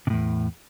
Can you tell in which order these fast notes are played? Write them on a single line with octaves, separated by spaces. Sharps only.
C3 A2 E2